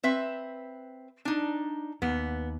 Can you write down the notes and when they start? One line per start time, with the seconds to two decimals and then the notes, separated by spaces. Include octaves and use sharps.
0.03 C4 B4 E5
1.25 D4 D#4
2.02 D#2 B3